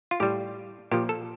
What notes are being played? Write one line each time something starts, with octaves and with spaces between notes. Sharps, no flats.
F4
A2 G3 G4
A#2 F3 G4
A4